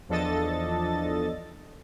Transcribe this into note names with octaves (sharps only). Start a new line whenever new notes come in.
E2 F3 D4 A4 D#5 A6